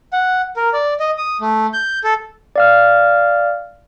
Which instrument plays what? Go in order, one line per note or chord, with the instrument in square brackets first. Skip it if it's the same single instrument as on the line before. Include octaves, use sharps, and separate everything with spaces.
[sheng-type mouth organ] F#5
A#4
D5
D#5
D#6
A3
G6
A4
[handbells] D5 F5 F6